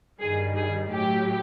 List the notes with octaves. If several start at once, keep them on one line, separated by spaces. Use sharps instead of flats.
G2 D#3 G3 G#4
G#4
A2 F#3 G4